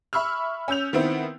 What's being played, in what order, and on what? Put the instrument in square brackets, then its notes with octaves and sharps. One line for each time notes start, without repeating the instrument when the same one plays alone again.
[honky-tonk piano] E5 B5 C#6 E6 F6
C#4 E6 G6 F7
D#3 B3 C4 E4